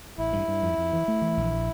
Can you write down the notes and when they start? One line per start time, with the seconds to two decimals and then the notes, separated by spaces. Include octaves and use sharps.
0.18 A1 E4
0.33 G2
0.48 G2
0.63 F2
0.78 F2
0.93 E3
1.08 A3
1.22 E3
1.37 A#1